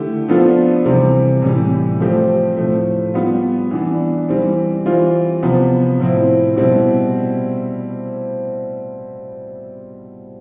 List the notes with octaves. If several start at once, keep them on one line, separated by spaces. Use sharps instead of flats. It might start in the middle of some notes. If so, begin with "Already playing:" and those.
Already playing: D3 A3 E4 G4
F3 B3 D4 F4 A4
C3 E3 G3 C4
A2 E3 G3
F3 A3 C4 G4
A2 F3 A3
G3 B3 F4
E3 B3 D4
E3 G3 C4
E3 G3 C4 F4
C3 F3 B3
A2 F3 C4 E4
B2 G3 C4 E4